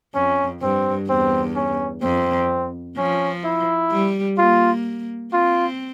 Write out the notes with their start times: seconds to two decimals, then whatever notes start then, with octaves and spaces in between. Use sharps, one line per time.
0.14 F2 C#4
0.61 G2 C4
1.09 E2 C4
1.55 C#4
2.02 F2 C4
2.97 F3 C#4
3.44 E4
3.91 G3
4.38 A#3 F4
5.33 C4 F4